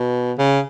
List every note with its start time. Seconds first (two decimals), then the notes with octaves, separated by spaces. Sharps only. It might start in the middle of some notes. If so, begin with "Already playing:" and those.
Already playing: B2
0.38 C#3